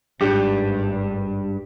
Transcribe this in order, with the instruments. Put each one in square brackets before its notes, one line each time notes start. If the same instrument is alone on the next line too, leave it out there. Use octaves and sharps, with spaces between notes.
[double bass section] G#1 [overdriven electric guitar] G2 [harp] D4 [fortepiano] G4